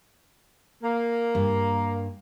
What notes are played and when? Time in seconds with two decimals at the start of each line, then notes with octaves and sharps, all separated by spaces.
0.83 A#3
1.35 G2